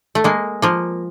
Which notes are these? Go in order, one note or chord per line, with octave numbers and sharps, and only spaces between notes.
A3
G#3 A#3
F3 A#3